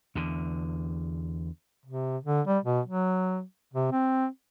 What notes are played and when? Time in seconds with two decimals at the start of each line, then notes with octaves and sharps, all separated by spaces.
0.15 E2 D3
1.85 C3
2.23 D3
2.47 G3
2.64 B2
2.86 F#3
3.73 C3
3.92 C4